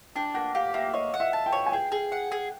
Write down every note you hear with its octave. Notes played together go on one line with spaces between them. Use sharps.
D4 G5
A#3 F#5
G4 F5
A#3 E5
C#5 D#5
F#5
E5
A5
G5
C#5
G#5
G#4 G5
G#4
F#5
G#4